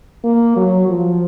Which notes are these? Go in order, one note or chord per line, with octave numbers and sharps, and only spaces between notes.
A#3
F#3
F3